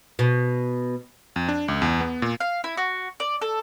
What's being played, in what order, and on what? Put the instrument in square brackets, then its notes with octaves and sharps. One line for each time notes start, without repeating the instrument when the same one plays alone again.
[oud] B2
[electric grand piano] F2
D4
C#2
E2
B3
A#2
[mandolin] F5
E4
F#4
D5
A4